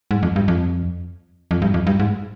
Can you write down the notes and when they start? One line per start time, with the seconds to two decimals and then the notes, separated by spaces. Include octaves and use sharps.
0.11 G#2
0.23 F2
0.36 G2
0.48 F2
1.51 F2
1.62 G2
1.74 F2
1.87 G2
2.00 G#2